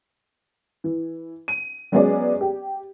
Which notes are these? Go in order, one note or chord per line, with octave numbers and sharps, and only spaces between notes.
E3
D#7
F#3 G#3 B3 C#4 G#4 D5
G4